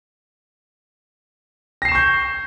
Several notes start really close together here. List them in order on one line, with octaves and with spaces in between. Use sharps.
A#6 C7 E7 C#6 G6